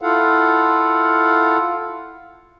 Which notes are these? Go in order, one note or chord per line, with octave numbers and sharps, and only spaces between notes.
E4 F4 A4 F5 F#5